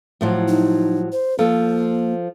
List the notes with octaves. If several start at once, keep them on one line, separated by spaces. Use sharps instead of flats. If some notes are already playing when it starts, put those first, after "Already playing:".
A2 F3 F#3
D#4
C5
F3 A#3 A4